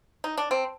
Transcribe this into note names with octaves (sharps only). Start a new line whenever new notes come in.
D#4
D4
C4